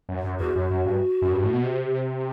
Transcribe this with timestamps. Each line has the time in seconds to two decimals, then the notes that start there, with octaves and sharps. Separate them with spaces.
0.09 F#2
0.24 F#2
0.40 E2 F#4
0.56 F#2
0.71 F#2
0.86 G2
1.22 F#2
1.33 G2
1.43 A2
1.53 B2
1.64 C3